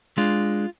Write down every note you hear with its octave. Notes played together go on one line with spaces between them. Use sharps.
G#3 D4 F4